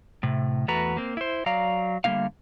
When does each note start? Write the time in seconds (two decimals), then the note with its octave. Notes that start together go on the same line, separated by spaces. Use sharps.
0.23 A2 C3
0.68 E2 A3 F#4 B4 A#5
0.97 A#3 C4
1.17 E4 C5
1.46 F#3 D5 F5 A#5
2.04 D3 G3 A3 A#3 D#4 F5